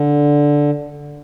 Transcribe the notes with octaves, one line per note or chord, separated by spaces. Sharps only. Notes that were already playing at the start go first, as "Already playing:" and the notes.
Already playing: D3